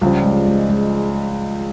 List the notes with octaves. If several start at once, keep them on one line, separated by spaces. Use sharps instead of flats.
C#2 C#3 F3 G3
G#3
G#3
G#3